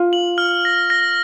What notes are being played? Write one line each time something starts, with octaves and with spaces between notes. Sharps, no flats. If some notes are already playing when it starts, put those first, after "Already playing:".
Already playing: F4
F#7
F6
A#6
A#6